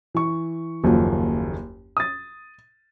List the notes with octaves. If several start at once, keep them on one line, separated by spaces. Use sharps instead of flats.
E3 C#6
F#1 D#2 F3 F#3
D#6 A6